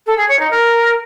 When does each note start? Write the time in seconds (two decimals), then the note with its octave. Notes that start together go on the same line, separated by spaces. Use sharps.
0.07 A4
0.18 G#4
0.29 C#5
0.40 D#4
0.50 A#4